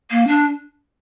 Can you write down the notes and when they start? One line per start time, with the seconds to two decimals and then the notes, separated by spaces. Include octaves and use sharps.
0.11 A#3
0.27 D4